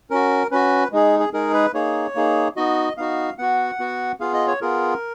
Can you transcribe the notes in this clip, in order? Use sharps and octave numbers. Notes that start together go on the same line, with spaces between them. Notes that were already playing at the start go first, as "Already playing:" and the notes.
C#4 F#4 A#4
C#4 F#4 B4
G#3 D#4 G#4
G#4
G#3 D#4 G#4 A#4
B4
A#3 D#4 G#4 C#5
A#3 D#4 G#4
B3 D#4 F#4 D#5
B3 D#4 F#4 F5
B3 F#4 F#5
B3 F#4
B3 F4 G#4 F5
D#5
C#5
B3 F4 G#4 A#4